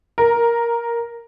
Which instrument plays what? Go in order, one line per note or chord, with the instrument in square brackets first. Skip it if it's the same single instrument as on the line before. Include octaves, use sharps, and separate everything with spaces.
[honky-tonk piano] A#4